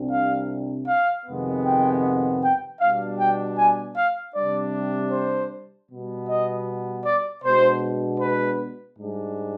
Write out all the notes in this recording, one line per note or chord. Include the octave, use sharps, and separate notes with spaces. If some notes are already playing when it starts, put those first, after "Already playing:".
Already playing: C2 C3 G3 D4
F5
F5
F2 C3 D#3 G#3 B3
G5
G5
B2 G3 B3 D4 F5
G5
G#5
F5
C3 G3 D4 D5
C5
B2 G3 B3
D#5
D5
B2 G#3 B3 D4 C5
B4
G#2 G3 D4